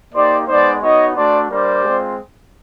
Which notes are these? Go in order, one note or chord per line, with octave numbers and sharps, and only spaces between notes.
A#3 D#4 G4 C5 D5
G#3 B3 D#4 C5 D5
B3 D#4 F#4 C#5 D#5
A3 D4 F#4 C5 D5
G3 A#3 D4 G4 C5 D5
G#3 C4 F4